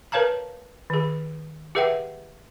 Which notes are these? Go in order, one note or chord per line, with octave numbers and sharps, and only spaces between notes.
A#4 B4 C#5 F5 A5 A#5
D#3 G#4
G4 G#4 B4 E5 F#5 G5